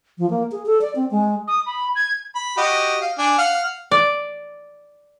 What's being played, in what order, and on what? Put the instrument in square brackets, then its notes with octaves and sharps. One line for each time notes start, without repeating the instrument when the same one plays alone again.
[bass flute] F3
A#3
G#4
A4
D5
C4
G#3
[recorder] D#6
B5
G#6
[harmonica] B5
F#4 G4 D#5
F5
D4 G#5
F5 F#5 F6
[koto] D5